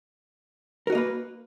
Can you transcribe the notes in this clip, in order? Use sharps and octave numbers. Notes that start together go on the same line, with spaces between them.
A#3 F#4 A#4 B4 D#5